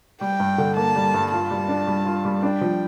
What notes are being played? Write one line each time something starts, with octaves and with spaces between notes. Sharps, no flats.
G3 G5
G2
D3
A#3 A5
G3
G2
F4 A5
G3
D4
G3
F4
G3
D4 G5
F3